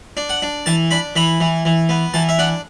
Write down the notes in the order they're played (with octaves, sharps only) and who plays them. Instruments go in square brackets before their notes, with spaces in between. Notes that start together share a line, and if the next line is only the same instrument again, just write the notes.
[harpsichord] D4
F#5
D4
E3 A5
D4 B5
E3 B5
E3
E3
B3
E3 A5
E5
D4 F#5